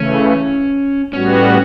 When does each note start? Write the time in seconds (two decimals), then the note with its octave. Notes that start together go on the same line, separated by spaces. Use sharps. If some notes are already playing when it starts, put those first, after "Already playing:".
Already playing: C#3 E3 A3 C#4
1.13 A2 G3 B3 C#4 F#4